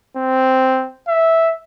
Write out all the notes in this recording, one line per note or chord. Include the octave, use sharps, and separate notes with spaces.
C4
E5